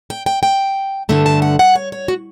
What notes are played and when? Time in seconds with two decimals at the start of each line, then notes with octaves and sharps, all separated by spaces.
0.10 G5
0.26 G5
0.43 G5
1.09 G2 D3 A3 A5
1.26 A5
1.42 F#5
1.59 F#5
1.75 C#5
1.92 C#5
2.08 F#4